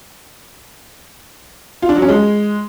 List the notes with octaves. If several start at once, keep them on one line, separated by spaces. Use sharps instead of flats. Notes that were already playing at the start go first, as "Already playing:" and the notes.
F4
D4
F#3
C#4
G#3